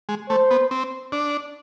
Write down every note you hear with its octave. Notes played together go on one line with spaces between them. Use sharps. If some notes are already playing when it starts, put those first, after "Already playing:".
G#3
A3 C5
B3
C4
D4